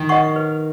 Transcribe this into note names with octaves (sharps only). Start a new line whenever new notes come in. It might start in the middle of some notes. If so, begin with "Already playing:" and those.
Already playing: D#3
D#5 F#5 C#6
B4